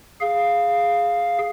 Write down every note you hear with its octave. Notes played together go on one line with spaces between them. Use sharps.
G#4 F5